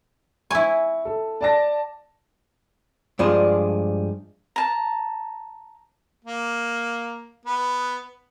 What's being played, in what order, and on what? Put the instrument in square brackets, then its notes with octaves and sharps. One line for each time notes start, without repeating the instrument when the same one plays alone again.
[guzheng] E4 G#5 [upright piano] C#6
[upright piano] A4
D5 A5 A#6
[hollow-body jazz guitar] G2 F3 G#3 D4 F4
[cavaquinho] A5 A#5
[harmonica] A#3
B3